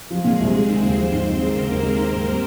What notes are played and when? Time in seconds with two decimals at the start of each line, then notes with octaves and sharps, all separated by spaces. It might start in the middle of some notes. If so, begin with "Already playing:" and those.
0.10 F3 G#3 G#4
0.24 A#2
0.40 C2
0.53 G#3 C4 C5
0.68 D#3
0.83 D#2
0.97 F3
1.12 G#2
1.26 G#1
1.39 G#3 A#3 A#4
1.54 C#3
1.69 D#2
1.83 G#3
1.97 D#3
2.12 G#2
2.26 G3